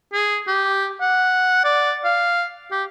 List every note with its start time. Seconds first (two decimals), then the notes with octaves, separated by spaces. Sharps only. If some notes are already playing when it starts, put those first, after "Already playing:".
0.13 G#4
0.48 G4
1.01 F#5
1.64 D5
2.04 F5
2.71 G4